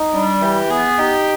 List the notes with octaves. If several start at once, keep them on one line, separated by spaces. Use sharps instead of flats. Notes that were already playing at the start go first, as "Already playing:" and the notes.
Already playing: D#4
G3 D4
E3 G4
B3 G#4
D#4 G4